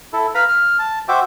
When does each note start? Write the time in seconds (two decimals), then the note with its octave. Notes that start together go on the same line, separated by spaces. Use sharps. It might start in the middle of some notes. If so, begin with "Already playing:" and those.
0.13 E4 A4
0.35 B4 F5 A#5 B5
0.48 F6
0.79 A5
1.08 F#4 C5 E5 G5 D6